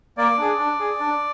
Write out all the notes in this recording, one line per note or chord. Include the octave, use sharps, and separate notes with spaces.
A#3 D5
D4 G#4
D4
G#4
D4